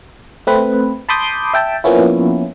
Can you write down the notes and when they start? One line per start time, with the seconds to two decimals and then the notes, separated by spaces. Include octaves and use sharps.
0.47 A3 C4 B4
1.09 A5 B5 C6 D6 D#6 G6
1.54 E5 G5 A5
1.84 F3 A#3 B3 C#4 E4